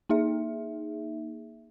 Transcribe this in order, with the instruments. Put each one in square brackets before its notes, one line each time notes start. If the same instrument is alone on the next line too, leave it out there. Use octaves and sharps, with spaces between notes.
[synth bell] A#3 D#4 G#4 E5